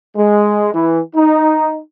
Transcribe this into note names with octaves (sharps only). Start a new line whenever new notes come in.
G#3
E3
D#4